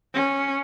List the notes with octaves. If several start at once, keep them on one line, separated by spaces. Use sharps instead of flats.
C#4